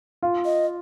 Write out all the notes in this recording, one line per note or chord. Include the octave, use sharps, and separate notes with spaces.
F4
D#5